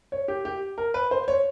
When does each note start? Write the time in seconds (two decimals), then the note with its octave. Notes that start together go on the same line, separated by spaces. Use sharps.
0.12 C#5
0.28 G4
0.45 G4
0.78 A#4
0.94 B4
1.11 C5
1.28 C#5